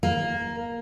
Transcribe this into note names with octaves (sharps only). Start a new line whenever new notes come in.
A#3